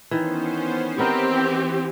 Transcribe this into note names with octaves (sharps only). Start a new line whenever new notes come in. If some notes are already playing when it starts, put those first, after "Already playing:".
D#3 E3 B3 C#4 C5
E3 B3 C4 D#4 G4 A#4